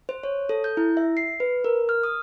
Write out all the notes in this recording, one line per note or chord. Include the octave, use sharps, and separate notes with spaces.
C5
C#5
A4
G6
E4
E5
C7
B4
A#4
F6
D#6